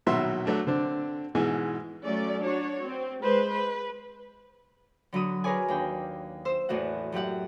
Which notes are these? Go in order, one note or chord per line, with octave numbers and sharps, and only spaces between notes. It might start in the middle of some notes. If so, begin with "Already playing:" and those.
A#1 B2 D#3 F#3 E5 C6
F#3 A3 D4
D3 C4 D4
G#2 B2 E3 G#3 G#5
F#3 A3 C#4 D5
D4 F#4 C#5
C4
G#3 B4 C5
B4
D3 F#3 B5 D#6
G#4 A#4 B4 C#5 D5 G#5
D#2 D4 G5
C5 E6
E2 A2 E3 F#4 F#5
F#2 F#3 G4 F#5